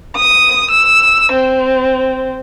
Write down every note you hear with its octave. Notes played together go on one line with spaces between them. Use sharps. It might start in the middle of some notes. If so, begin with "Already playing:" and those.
D#6
E6
C4